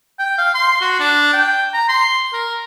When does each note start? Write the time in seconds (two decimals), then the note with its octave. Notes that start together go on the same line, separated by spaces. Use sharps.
0.19 G5
0.38 F5
0.55 C6
0.81 F#4
1.00 D4
1.33 G5
1.74 A#5
1.89 C6
2.33 A#4